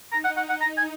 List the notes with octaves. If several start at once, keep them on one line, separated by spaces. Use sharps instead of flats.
D#4 A#5
F#5
F#5
F#5
A#5
G#5